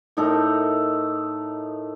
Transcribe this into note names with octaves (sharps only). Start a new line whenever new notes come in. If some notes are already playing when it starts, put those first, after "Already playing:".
A2 D#4 A4 A#4